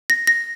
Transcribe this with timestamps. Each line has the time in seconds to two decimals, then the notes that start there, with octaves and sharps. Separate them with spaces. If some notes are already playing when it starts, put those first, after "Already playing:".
0.10 A#6
0.27 A#6